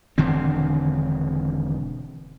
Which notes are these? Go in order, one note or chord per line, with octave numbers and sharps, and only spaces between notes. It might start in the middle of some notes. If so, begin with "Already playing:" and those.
E1 D3 D#3 C4